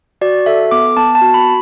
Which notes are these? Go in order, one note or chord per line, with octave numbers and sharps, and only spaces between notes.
F#4 D5
A4 E5
B3 D6
B3 A5
A5
F#4
B5